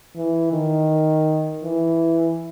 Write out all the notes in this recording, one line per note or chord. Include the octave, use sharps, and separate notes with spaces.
E3
D#3
E3